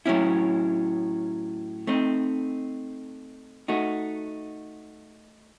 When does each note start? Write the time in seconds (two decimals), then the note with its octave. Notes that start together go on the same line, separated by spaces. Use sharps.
0.06 A2 F#3 C#4 E4
1.87 A3 C4 D#4
3.68 A3 D#4 F#4